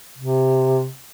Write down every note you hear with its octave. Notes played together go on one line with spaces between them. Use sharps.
C3